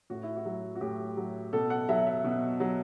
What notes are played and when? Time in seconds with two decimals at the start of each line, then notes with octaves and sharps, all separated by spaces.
0.10 A2 F#4
0.23 E4
0.36 F#4
0.45 F#3
0.75 F#4
0.81 A2 G4
1.17 F#3
1.53 B2 A4
1.70 F#5
1.89 F#3 E5
2.07 E5
2.24 B2
2.60 F#3